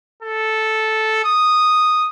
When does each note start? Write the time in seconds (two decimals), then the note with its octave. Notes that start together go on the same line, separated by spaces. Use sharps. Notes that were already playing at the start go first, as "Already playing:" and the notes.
0.23 A4
1.24 D#6